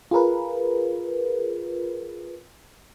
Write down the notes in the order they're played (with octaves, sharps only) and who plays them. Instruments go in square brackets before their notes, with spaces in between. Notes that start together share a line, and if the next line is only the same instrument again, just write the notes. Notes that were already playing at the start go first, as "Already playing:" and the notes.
[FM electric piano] F4 G#4 A#4 B4